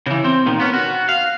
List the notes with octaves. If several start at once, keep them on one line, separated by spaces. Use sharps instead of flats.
C#3 E3
C4
A#2 D#3
B3 C#4
F#4
F5